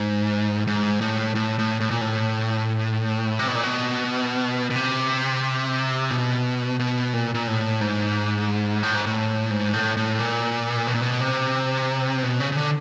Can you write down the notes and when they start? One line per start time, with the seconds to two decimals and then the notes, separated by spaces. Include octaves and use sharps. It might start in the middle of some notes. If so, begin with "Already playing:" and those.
Already playing: G#2
0.67 G#2
1.01 A2
1.35 A2
1.59 A2
1.80 A2
1.91 A#2
2.01 A2
3.39 C3
3.47 B2
3.55 A#2
3.63 B2
4.71 B2
4.76 C3
6.11 B2
6.79 B2
7.13 A#2
7.34 A#2
7.47 A2
7.81 G#2
8.83 A2
8.95 G#2
9.06 A2
9.51 G#2
9.73 A2
9.97 A2
10.19 A#2
10.87 B2
10.94 A#2
11.01 B2
11.21 C3
12.23 B2
12.40 C#3
12.52 C#3
12.56 D3